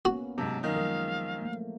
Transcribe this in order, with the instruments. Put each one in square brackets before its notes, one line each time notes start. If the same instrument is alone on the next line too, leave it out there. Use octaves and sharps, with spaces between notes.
[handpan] A#3 B3 C#4 [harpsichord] F#4
[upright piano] G#2 C3 [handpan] F#3 [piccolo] A5
[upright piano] F#2 D#3 D#4 [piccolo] F5
[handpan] F3 G#3 A#4
A3 A#3